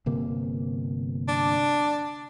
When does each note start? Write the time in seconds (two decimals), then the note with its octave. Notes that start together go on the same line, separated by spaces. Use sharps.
0.06 G1 C3 A#3
1.28 D4